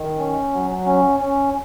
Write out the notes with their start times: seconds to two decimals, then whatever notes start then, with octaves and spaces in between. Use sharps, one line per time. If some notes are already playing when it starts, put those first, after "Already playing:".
Already playing: D#3
0.19 C#4
0.53 F#3
0.86 C#4
1.20 C#4